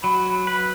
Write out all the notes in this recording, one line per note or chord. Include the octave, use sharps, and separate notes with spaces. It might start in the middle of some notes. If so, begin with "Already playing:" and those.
F#3 B5
B4